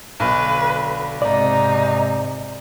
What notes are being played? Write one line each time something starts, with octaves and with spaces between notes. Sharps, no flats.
B1 D3 B4
G#2 C3 D#4 D5